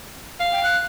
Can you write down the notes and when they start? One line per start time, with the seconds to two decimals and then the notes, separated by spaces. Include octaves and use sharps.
0.40 F5
0.52 G5
0.63 F#6